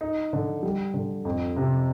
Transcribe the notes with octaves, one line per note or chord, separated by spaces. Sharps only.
D#4
D3
G3
D3
F2
C3